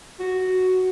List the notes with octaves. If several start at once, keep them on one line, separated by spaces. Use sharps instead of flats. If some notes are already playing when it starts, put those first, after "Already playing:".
F#4